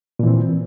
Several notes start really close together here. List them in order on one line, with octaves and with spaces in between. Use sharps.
A#2 E3 C4